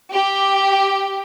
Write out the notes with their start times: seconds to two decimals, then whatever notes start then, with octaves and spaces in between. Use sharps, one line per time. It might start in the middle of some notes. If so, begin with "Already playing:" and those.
0.12 G4